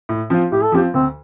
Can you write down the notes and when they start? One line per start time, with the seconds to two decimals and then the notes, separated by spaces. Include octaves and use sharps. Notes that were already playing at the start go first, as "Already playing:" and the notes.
0.09 A2
0.30 F3 C4 F4
0.52 A2 G4
0.63 A4
0.72 F3 C4 F4 G4
0.94 D2 C4